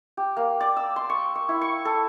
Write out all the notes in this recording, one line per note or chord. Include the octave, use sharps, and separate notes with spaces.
G4
A#3
D5
E6
C6
C#6
C#6
E4
C#6
A4